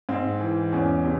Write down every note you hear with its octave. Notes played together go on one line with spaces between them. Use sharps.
G#2 C4
E3
E2 C#4
C3